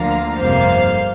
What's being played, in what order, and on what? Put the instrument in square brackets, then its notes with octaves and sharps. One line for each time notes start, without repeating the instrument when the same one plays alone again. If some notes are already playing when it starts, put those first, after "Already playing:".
Already playing: [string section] D2 D3 F3 A#3 F5 A#5
G1 F2 C3 G3 A#3 C5 F5